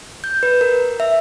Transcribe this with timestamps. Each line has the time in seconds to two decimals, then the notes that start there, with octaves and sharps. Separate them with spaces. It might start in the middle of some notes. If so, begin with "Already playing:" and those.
0.24 G6
0.43 B4
0.61 A#4
1.00 E5